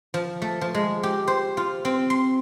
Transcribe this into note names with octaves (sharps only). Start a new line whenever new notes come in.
F3
A3
F3
G#3
G4
C5
F4
C4
C6